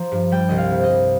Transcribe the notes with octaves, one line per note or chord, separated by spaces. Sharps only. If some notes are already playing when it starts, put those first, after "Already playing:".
Already playing: F3 A#5
G2
G3 G5
C2 D#5
F5
C3
D#5
C2